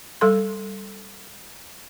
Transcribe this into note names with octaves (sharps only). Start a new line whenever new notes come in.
G3 A4 C6